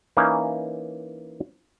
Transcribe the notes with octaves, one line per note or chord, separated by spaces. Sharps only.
E3 A#3 C#4 D#4